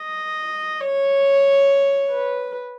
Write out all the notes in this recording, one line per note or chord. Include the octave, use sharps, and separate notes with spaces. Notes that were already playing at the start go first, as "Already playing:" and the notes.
Already playing: D#5
C#5
B4